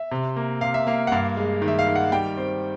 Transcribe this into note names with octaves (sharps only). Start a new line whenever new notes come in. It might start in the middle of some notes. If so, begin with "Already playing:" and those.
Already playing: E5
C3
A#3
C3 F5
E5
A#3 F5
F#5
G2 F5
G#3
D#3
E5
F5
D#3
F#5
G3 G5
C4